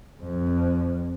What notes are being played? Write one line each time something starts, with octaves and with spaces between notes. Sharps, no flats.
F2